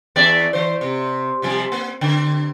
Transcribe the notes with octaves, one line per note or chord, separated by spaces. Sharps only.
E2 D5 E5
E3 C5
C3
C3 F3 G3
A#3
D3